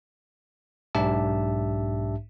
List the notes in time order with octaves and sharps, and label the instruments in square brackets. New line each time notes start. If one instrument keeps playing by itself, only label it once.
[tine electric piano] B1 G#2 D4 G4 E5 A5